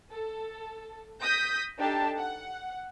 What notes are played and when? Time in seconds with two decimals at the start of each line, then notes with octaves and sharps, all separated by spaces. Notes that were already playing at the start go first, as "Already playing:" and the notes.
0.11 A4
1.21 D#6 G6 A#6 B6
1.79 D4 D#4 G4 A4 A5
2.19 F#5